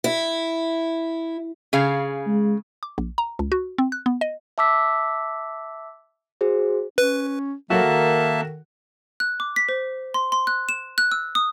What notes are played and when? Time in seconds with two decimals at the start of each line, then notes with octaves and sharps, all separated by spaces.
0.04 E4
1.73 C#3 G#4 F5
2.26 G#3
2.83 D6
2.98 A#1
3.18 A#5
3.39 C#2
3.52 F#4
3.78 C4
3.92 F#6
4.06 B3
4.21 D#5
4.58 E5 A5 D6 E6 B6
6.41 F#4 G#4 C5
6.98 C#4 B4
7.70 F#3 A#3 F#4 A4 A#4 E5 A5
7.83 D#3
9.20 F#6
9.40 D6
9.56 B6
9.69 C5
10.14 C6
10.32 C6
10.47 F#6
10.69 E7
10.98 F#6
11.12 E6
11.35 D#6